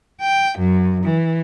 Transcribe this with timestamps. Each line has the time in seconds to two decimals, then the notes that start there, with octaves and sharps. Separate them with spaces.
0.21 G5
0.59 F#2
1.04 E3